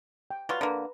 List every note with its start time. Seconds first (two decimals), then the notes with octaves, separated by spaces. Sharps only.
0.31 G5
0.49 F#3 G3 F4 B4 A#5 B5
0.61 D3 A#3 B4 A#5